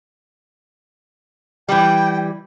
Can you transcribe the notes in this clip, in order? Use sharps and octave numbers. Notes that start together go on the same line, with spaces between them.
E3 G3 G5